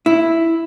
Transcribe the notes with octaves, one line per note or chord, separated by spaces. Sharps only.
E4